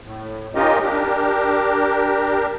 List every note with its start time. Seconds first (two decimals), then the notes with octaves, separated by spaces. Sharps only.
0.01 A2
0.55 C#4 D#4 F4 G4 A#4 D#5
0.82 D4 G4 A#4